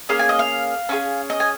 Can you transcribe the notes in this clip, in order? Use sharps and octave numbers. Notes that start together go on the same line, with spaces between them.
A#3 C#4 G#4 F5
G#5
D#5
F5
C#4 F4 G#4
D#5
G#5